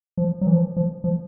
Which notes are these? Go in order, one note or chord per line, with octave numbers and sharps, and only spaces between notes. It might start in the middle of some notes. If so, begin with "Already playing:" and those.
F3
F#3
E3
F3
F3
F3